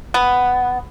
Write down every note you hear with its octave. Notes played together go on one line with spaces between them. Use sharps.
B3